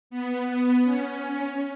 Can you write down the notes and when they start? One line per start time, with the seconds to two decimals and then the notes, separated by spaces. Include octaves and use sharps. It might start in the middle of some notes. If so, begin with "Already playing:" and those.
0.10 B3
0.84 C#4